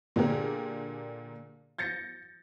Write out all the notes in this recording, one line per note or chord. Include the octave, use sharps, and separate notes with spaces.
A#2 D3 D4 G4 G#4 A#4
G6 A6 A#6 C#7